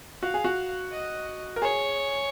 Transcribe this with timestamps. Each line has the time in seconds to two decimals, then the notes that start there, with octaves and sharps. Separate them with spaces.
0.22 F#4 F5
0.34 G#4
0.44 F#4
0.92 D#5
1.56 A#4
1.62 G#4 C#5